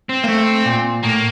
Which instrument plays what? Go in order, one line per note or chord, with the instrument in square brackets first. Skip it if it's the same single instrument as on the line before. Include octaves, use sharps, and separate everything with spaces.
[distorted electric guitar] C4
[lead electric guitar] A#3
A3
A#2
[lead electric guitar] A2 [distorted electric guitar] A#3